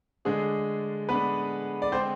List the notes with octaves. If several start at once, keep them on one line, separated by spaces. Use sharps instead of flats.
D3 G#3 A3 D4 G#4
D3 A3 B3 D4 B4
D5
D3 G#3 C4 C5